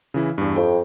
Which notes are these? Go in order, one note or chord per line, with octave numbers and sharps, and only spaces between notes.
C#3 E3 E4
E2 G2
F2 G5